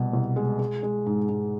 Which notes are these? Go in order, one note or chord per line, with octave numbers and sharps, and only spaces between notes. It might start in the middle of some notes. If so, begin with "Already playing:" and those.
Already playing: C2 B2
C2
G#3
G#3
G#3
G#2
G#2